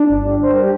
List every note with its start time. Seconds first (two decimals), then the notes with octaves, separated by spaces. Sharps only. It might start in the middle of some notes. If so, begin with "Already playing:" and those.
Already playing: D4
0.09 G1
0.24 G3
0.39 G3 C5
0.52 A#4
0.61 G4